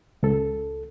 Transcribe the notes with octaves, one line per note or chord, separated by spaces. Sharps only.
C#2 A4